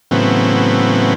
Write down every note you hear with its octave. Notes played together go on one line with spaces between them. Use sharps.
A2 C#3 E3 F#3 B3 C4